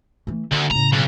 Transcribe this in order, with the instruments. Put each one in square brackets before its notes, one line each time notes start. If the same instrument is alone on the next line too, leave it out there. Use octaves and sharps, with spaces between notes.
[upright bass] E3 A3
[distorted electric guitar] D2 [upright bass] A#3
[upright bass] A2 C#3 [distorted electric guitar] A#5
[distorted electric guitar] B1